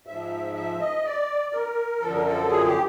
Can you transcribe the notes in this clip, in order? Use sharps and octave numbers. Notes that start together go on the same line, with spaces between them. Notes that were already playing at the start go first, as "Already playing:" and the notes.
G#2 F3 E5
E5
D#5
D5
A#4
F#2 D3 F3 A4
A#4
A4
G#4
G4